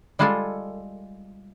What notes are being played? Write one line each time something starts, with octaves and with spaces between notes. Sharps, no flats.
G3 G#3 F4 G#4 A4